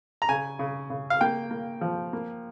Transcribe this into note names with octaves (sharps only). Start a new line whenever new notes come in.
A#5
C#3 G#5
C#3
C#3
F5
A#3 G5
A#3
F3
A#3